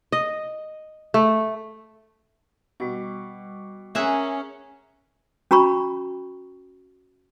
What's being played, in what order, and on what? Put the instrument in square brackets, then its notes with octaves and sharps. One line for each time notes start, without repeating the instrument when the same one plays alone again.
[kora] D#5
A3
[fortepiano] B2 [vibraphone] G3 D6
[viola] C#4 [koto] G#4 E5 F#5 [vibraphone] A#4 G#5 A#5
[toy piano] C#4 F#4 A#5 B5 C#6